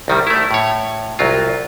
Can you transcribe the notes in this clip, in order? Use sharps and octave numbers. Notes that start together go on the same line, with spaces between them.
C2 D#3 G3
A3 E4
A2 C#5
C2 F#3 F4